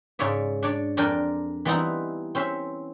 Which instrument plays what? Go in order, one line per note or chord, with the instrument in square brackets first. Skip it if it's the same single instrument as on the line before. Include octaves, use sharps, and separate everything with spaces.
[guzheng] G#2 C#3 C#5 D5 E5
D4 C#5 D5
F2 D4 A#4 D5 G5 G#5
E3 G3 B3 C4 D#4 E4
C4 C#4 C5 E5